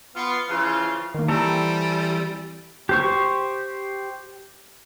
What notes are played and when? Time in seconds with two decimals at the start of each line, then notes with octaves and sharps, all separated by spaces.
0.16 B3 F4
0.49 C#3 E3 F3 F4
1.14 D#3 A#3
1.28 E3 G3 C4 A4 A5 A#5 C#6
2.89 G4 C5 C#6